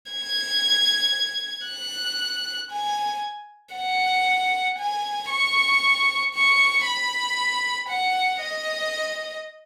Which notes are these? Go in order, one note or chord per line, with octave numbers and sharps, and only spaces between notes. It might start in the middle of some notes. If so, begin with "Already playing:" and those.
G#6
F#6
G#5
F#5
G#5
C#6
C#6
B5
F#5
D#5